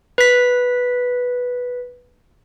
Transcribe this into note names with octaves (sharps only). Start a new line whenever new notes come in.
B4 B6